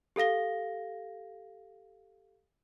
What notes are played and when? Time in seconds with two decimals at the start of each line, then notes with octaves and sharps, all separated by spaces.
0.16 G4 A4 F5 A#6 G7